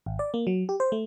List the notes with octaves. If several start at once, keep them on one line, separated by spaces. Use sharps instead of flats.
G#1
D5
A#3
F#3
G4
C5
A3